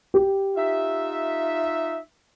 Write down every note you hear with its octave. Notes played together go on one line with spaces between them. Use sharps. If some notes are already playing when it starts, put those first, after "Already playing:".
G4
D#4 F4 E5